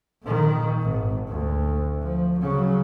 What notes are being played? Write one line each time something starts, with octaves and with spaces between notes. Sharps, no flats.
A#2 D#3
G#1
D2
F3
C#3 F#3